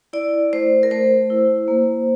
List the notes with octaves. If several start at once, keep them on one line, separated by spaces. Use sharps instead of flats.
E4 D5
A3 C5
A#4
A3 C5
E4
A#3